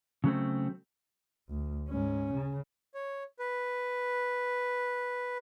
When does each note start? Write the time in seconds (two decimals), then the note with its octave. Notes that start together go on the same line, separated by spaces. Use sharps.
0.24 C#3 F#3 A3 C4
1.49 D2
1.89 G#2 C#4
2.33 C#3
2.94 C#5
3.39 B4